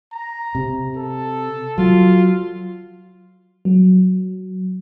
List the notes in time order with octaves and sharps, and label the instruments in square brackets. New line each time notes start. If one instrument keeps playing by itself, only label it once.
[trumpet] A#5
[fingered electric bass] C3
[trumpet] A4
[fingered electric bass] F#3 [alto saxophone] F4
[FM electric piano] F#3